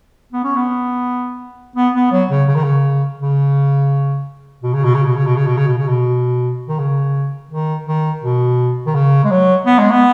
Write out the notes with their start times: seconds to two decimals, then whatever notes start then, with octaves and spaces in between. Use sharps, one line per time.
0.33 B3
0.44 C#4
0.56 B3
1.76 B3
1.95 B3
2.11 F#3
2.30 C#3
2.48 C#3
2.55 D#3
2.63 C#3
3.20 C#3
4.63 B2
4.74 C#3
4.84 B2
4.94 C#3
5.05 B2
5.16 C#3
5.26 B2
5.36 C#3
5.46 B2
5.57 C#3
5.67 B2
5.78 C#3
5.88 B2
6.69 D#3
6.79 C#3
7.51 D#3
7.86 D#3
8.23 B2
8.86 D#3
8.94 C#3
9.24 G#3
9.31 F#3
9.66 B3
9.79 G#3
9.91 B3